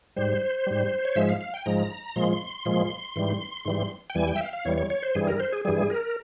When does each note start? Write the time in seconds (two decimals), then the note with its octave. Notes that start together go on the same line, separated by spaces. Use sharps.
0.16 G#2 G3 C5
0.67 G#2 G3
1.05 C#5
1.16 G#2 F3 G#3 E5
1.29 F5
1.41 F5
1.54 G5
1.66 G#2 F3 G#3 A#5
2.16 A#2 F3 G#3 C6
2.65 A#2 F3 G#3
3.16 G#2 E3 G3
3.65 G#2 E3 G3 C6
4.10 G5
4.15 E2 E3 G3 G#5
4.28 G5
4.36 E5
4.41 F5
4.53 F5
4.65 E2 E3 G3 C#5
4.78 C#5
4.90 C#5
5.02 C5
5.15 G2 E3 G3 G#4
5.27 A#4
5.40 C5
5.52 G#4
5.65 G2 E3 G3 G#4
5.90 A#4